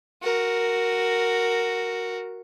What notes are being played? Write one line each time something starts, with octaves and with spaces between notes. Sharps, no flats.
F#4 A#4